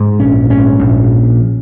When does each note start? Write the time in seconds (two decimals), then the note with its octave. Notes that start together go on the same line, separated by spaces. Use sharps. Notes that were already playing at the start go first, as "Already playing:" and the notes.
Already playing: G#2
0.20 A#1 C#4
0.50 G#2 C#4
0.79 A#1